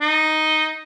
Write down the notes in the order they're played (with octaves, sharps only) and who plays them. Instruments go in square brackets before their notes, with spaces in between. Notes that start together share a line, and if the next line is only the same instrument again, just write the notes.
[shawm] D#4